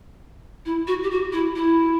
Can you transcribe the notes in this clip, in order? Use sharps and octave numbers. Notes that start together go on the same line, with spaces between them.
E4
F#4
G4
F#4
E4
E4